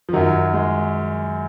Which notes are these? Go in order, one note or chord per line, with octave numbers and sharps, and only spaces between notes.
F3
F#2 D#3 F#3
G#3